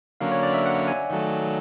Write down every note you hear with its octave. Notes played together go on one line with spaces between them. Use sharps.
D3 F#3 A#3 C#4 F5
C#5
D5
E5
F#5
G#5
D#3 F#3 A3